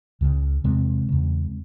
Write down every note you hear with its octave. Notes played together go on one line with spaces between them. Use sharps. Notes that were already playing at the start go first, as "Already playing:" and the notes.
C#2 C#3
E2 C3 G#3 C4
E2 C#3